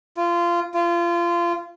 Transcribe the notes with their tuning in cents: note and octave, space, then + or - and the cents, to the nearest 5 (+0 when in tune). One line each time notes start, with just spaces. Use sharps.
F4 -20
F4 -25